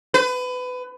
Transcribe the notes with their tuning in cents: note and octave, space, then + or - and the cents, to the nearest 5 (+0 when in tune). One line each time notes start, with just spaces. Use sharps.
B4 +25